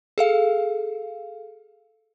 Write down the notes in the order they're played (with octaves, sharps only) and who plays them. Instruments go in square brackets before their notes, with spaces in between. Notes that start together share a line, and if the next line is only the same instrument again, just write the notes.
[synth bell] G#4 A4 F5